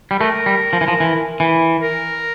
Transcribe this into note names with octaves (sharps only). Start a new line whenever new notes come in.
G3
A3 A#4
G3
F3
E3
F3
E3
E3
A#4